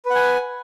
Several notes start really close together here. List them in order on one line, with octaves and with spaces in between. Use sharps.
B4 F#5 G#5